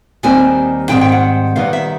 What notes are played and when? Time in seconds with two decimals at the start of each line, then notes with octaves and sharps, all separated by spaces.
0.23 D#2 D#3 G3 C4 G#5
0.89 G#2 D#3 G3 C4 G5
1.01 G5
1.12 F#5
1.56 C3 D#3 G3 B3 F5
1.73 E5